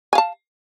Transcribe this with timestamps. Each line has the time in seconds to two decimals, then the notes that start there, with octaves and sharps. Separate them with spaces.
0.13 G#5
0.15 F5
0.18 A5